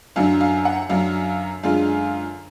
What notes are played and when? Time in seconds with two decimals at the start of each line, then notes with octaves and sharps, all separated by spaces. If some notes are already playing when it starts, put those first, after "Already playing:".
0.16 F#2 D3 F#3 D4 F5
0.41 F5
0.65 F#5
0.89 F#2 D3 F#3 D4 F5
1.63 F#2 D3 G#3 D4 F4 F5